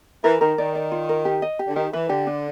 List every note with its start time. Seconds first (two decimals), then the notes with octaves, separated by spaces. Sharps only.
0.24 E3 A#4
0.41 D#3 A#4
0.58 D#3 D5
0.75 D5
0.92 F4
1.09 A#4
1.25 G4
1.42 D#5
1.59 G4
1.67 D3
1.76 D#3 G4
1.93 E3 B4
2.09 D3 G4
2.27 D4